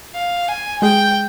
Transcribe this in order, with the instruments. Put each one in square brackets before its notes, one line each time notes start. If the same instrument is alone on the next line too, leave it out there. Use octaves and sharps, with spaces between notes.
[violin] F5
G#5
[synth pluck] G#3 G#4 [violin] G5